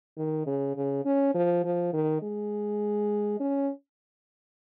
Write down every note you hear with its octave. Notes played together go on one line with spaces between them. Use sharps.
D#3
C#3
C#3
C#4
F3
F3
D#3
G#3
C#4